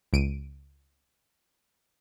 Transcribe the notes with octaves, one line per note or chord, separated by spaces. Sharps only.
C#2 D7 D#7